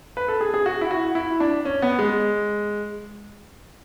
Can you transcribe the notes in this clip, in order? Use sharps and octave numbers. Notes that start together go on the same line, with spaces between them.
B4
A4
G#4
G#4
F#4
E4
F#4
E4
D4
C#4
B3
G#3